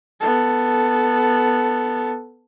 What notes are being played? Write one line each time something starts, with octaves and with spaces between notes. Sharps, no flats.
B3 A4